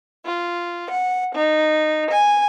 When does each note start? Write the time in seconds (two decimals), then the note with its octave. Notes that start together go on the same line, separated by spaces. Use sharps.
0.25 F4
0.89 F#5
1.34 D#4
2.09 G#5